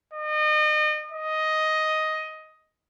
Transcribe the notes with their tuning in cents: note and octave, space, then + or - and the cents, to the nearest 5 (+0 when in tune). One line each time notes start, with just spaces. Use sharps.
D#5 -35
D#5 +10